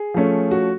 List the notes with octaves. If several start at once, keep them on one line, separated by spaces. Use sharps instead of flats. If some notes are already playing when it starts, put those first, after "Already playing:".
Already playing: G#4
F3 A3 C#4
F#4